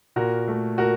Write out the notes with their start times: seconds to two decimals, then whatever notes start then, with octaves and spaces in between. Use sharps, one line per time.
0.16 A#2 F#4 A#4
0.48 A3
0.78 A#2 F#4 A#4